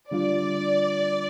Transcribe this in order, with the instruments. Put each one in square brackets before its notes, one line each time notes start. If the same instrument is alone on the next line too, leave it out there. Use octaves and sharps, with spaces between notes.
[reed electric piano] D3 G3 D4 F4 [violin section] D5